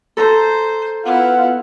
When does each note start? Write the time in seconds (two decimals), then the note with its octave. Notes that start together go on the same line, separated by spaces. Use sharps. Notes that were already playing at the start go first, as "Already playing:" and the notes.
0.17 A4 C5 A#5
1.05 B3 E4 F4 F#5